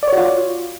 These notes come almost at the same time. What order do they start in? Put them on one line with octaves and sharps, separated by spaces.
D5 C#5 F#4 F4